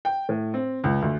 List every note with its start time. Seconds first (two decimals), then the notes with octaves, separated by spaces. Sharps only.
0.05 G5
0.29 A2
0.54 C4
0.84 C#2
1.02 D2